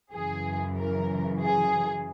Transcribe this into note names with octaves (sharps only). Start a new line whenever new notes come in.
F#2 C#3 E3 G#4
A#4
G#4